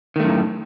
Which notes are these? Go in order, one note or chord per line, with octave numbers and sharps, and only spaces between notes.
F#2 A2 D#3 A3